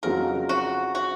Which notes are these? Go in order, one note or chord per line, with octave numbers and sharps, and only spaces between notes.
F2 C#3 F#3 A#4
F#4
F#4